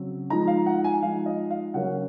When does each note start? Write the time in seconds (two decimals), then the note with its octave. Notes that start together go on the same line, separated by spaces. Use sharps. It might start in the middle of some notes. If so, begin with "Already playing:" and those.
Already playing: C#3 F#3 C4
0.30 F3 G#3 D#4 A#5
0.47 F5
0.66 F#5
0.84 G#5
1.02 F3 G#3 D#4 F5
1.26 D#5
1.50 F5
1.74 C#3 F#3 A#3 C#4 F#5